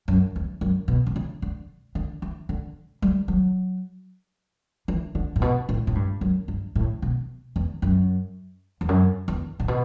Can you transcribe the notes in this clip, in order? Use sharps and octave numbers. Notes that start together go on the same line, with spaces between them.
F#2
E2
F#2
B2
B2
C#3
D3
D3
E3
D3
G3
F#3
E3
D3
A2
B2
A2
A2
G2
F#2
G2
A2
B2
E2
F#2
E2
F#2
E2
A2
B2